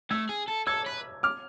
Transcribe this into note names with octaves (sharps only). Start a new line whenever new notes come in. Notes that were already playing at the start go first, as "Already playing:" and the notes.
A3 E6 G#6
G#4
A4
A4 E6 G#6
B4
D6 F6